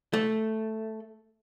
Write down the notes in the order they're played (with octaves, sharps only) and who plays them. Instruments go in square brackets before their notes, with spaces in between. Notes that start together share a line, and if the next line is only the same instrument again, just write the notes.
[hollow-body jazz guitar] A3